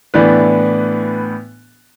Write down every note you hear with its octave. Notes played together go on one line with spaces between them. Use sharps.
A2 E3 B3 D4 B4 D5